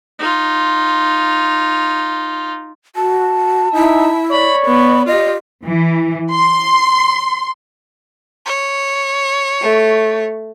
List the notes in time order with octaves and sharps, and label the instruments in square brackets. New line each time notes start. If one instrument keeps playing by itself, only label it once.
[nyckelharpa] D#4 F4
[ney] F#4 [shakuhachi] A5
[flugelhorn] D#4 [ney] E4 [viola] E5
[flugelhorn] C#5 [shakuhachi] D5 [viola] B5
[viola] B3 [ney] B5
[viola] F4 G4 [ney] D#5
[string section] E3
C6
[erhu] C#5
[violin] A3